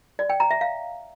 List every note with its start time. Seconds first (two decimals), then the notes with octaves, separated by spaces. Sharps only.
0.19 D5
0.30 G5
0.40 A#5
0.51 E5
0.61 F5